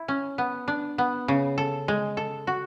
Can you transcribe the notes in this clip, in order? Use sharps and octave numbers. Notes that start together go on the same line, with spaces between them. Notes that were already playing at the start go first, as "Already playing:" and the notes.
Already playing: E4
C#4
B3
D4
B3
C#3
A4
G#3
A4
F#4